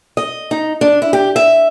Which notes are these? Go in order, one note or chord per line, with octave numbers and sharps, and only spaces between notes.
D#5
D#4
D4
E4
G4
E5